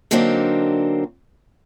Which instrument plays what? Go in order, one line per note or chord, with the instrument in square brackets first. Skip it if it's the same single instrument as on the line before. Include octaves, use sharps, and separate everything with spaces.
[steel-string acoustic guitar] D3 F#3 A#3 C4 D4 D#4